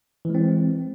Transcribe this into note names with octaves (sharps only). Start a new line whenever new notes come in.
E3 G#3 C4